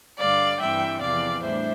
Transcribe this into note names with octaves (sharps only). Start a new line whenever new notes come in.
G2 D3 G3 D5 F5
G2 E3 G3 C4 E5 G5
E2 C3 F3 D5 F5
A2 G3 D4 C5 E5